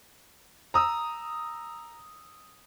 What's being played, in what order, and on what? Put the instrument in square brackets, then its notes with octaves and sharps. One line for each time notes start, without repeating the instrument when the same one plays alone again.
[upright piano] A#5 D#6 E6